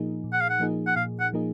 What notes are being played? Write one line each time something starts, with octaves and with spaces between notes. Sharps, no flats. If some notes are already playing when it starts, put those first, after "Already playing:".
Already playing: A#2 F3 A#3 D#4 G#4
A#2
F#5
F5
F#5
F3 A#3 D#4 G#4
F#5
A#2 F5
F#5
F3 A#3 D#4 G#4